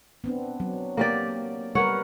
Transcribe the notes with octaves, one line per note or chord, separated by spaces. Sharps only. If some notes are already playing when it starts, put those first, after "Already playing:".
B3 C4 D4
F#3
A#3 G4 D5
G3 A#4 B4 C#5 F#5